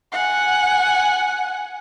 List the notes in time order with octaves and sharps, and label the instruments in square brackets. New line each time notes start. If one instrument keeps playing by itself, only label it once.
[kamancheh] F#5 G#5